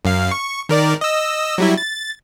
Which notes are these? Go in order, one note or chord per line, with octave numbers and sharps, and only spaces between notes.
F#2 F5
C#6
D#3 A#4 D5
D#5 E6
F#3 G3 E4
A6